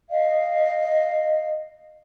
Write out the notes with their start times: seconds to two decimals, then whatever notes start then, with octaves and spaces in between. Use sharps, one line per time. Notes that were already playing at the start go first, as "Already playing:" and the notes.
0.11 D#5 F5